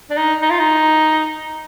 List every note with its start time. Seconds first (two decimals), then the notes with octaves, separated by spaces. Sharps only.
0.10 D4
0.17 D#4
0.42 D#4
0.51 F4
0.59 D#4